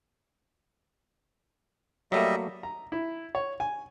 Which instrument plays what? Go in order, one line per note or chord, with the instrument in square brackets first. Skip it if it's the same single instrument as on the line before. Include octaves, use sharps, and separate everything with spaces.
[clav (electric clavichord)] F#3 A3 A#3 [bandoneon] G3 D#5 E5
[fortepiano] A#5
E4
C#5
G#5